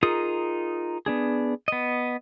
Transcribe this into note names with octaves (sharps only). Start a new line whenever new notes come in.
D#4 F4 G#4 A#4 D#6
B3 D4 G#4
B3 D#5